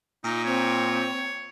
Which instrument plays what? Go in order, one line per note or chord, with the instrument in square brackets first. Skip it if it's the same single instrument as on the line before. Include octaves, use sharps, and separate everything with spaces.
[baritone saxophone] A#2 [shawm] D#4
[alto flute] C4 [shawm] C#5